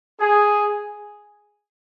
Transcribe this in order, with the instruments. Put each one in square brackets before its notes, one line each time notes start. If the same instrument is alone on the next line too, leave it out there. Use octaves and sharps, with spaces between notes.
[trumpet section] G#4